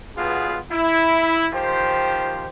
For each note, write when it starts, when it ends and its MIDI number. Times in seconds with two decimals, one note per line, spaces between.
0.16 0.56 35
0.16 0.56 47
0.16 0.56 59
0.16 0.56 65
0.16 0.56 68
0.70 1.46 64
1.53 2.45 51
1.53 2.45 53
1.53 2.45 67
1.53 2.45 72